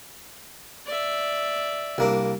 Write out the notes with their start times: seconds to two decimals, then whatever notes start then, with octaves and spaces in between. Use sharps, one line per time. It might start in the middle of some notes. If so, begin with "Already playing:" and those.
0.86 D5 E5
1.98 C2 A#3 D4